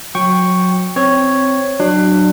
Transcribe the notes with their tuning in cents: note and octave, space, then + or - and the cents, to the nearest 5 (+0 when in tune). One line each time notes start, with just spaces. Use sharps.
F#3 -20 G5 +0 C#6 +0
C4 +0 C#5 +0
F#3 +10 D4 +30